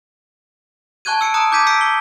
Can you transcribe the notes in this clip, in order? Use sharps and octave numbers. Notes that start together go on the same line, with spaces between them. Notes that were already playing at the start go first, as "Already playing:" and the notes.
G#5 A5 C#6 F#6 G#6 D#7
E6 C#7 D7
A5 A#5 D#6 F#6 D7
D6 G6 G#6 B6 D#7
E6 B6 C#7 D7
G7